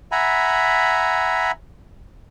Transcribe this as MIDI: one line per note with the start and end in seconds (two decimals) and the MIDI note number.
0.12 1.51 76
0.12 1.51 78
0.12 1.51 80
0.12 1.51 82
0.12 1.51 83